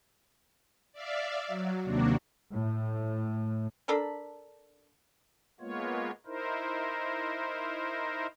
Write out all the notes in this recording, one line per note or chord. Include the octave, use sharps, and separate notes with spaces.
D5 E5 F5
F#3
D#2 C3 A#3 D4 F#4
A2
D4 A4 A#4 B5
G#3 A#3 B3 F4 C#5
D#4 E4 A#4 C5